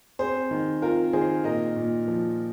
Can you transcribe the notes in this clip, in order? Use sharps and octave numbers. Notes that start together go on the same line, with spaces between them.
C4 G#4 C5
D#3
C4 F4 A#4
D#3 G#4 C5
A#2 A#4 D#5
A#2
F3